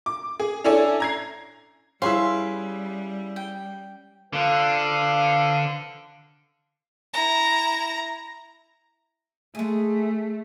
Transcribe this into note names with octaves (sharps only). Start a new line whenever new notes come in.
D6
G#4
C#4 D4 E4 A4 D5 G#5
A#5 G#6 C7
G3 C#4 E4 G#4 B4 E5 F5 C6
G5
D3 F3 B4 F5
E4 A#5
G#3 A3 G#4